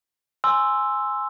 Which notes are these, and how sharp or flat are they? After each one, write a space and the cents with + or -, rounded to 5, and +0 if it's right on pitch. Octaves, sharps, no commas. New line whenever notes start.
G#5 +0 C6 +0 E6 +0